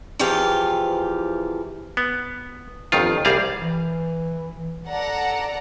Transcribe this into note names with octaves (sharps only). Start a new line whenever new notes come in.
E2 E3 F3 G4 F5
B3
G1 F2 D#3 F4
C2 G3 G#4 F5
E3
A4 D5 F#5 A#5